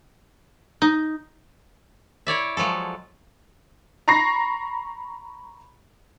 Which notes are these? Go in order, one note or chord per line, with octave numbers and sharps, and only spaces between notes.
D#4
E4 C#5 D5 E5
F3 F#3 G#3 A4
A#5 B5 C#6 A#6 C7